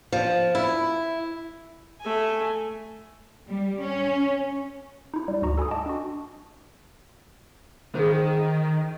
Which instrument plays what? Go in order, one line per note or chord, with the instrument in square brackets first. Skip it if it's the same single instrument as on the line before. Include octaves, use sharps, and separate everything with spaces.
[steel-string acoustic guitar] F3
E4
[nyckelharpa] A3 G#5
[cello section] G3
C#4
[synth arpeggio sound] D#4 E4
G3
D2 G#2 F#4 A#5 C#6
A4 G#5 B5 D#6
D#5 G5 A5 D6
D4 F#4
[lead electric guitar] D#3 [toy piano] G#4 C5